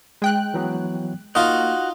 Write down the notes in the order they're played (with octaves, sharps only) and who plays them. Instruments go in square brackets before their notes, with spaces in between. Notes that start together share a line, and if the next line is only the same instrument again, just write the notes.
[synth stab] G#3 G5 F#6
[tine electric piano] E3 F#3 B3
[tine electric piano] A#3 [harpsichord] D#4 F4 [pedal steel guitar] F#4